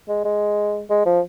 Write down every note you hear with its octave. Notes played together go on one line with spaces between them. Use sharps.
G#3
G#3
G#3
F3